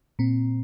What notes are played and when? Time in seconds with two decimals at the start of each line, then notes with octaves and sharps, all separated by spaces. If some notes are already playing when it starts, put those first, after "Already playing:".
0.19 A#2 C4